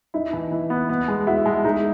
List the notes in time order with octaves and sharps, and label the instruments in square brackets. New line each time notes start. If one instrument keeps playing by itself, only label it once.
[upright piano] D#4 [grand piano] E4
[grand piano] E3
E3
B3
B3
G#3
[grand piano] E4 [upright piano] F#4
[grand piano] G#3
[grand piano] D#4 [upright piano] G#4